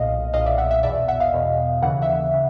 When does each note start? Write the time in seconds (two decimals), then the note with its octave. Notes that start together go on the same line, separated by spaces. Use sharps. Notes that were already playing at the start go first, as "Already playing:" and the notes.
Already playing: B1 A#2 D#5 F5
0.33 B1 A#2 D#5 F5
0.46 D5 E5
0.58 E5 F#5
0.71 E5 F#5
0.83 E2 B2 D5 E5
1.08 E5 F#5
1.20 D#5 F5
1.33 E2 B2
1.82 D#2 C#3 E3 F#5
2.02 E5 F#5
2.34 C#3